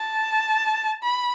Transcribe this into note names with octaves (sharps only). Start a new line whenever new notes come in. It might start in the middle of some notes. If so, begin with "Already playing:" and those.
Already playing: A5
B5